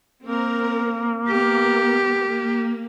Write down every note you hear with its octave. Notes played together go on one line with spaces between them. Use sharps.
A#3 C4 A#4
B3 G4 A#4
A#3